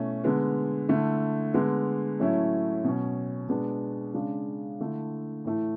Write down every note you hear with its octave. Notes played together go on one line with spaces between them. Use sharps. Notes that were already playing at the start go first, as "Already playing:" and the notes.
Already playing: B2 A3 C#4 E4
D3 G#3 B3
D3 A3 E4
D3 G#3 B3
A2 F#3 A3 C#4 E4
B2 F#3 C#4
B2 G#3 B3 D4
C#3 G#3 D4
D3 A3 E4
A2 E3 A3